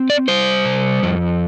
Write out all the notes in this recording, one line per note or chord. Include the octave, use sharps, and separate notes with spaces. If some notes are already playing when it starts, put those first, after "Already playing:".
Already playing: C4
D5
G3 C5
C3
F2